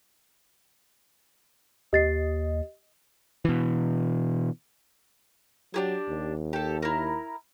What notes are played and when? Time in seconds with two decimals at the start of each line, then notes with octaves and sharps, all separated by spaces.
1.93 D#2 G4 D#5 A6 C7
3.45 B2 E3
5.74 F#3 D4 G4 G#4
6.09 D#2
6.53 G4 A4
6.83 E4 A#4